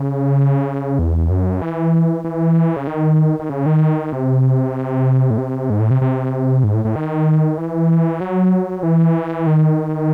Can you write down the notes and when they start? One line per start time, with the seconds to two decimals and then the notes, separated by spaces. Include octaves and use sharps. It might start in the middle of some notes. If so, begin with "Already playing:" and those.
Already playing: C#3
0.99 E2
1.30 F#2
1.62 E3
2.24 E3
2.76 C#3
2.87 D#3
3.39 D#3
3.50 C#3
3.66 D#3
4.12 C3
5.30 A2
5.38 C3
5.70 G#2
5.80 A2
5.91 C3
6.01 C3
6.64 G#2
6.74 A2
6.85 A2
6.96 D#3
7.58 E3
8.21 F#3
8.83 E3
9.47 D#3